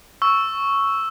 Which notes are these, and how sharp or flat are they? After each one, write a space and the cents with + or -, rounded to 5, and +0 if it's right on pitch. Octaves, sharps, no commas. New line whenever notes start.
C#6 +0 E6 +0